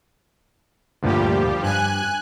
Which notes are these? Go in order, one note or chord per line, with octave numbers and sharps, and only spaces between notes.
D2 G2 A#2 F3 G3 G4
G2 G#5 F#6